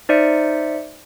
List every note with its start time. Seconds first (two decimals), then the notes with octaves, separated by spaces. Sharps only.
0.09 D#4 C5 D5 E5 C#7